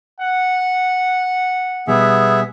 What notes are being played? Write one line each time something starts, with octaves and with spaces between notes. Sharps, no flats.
F#5
B2 G3 B3 G#4 E5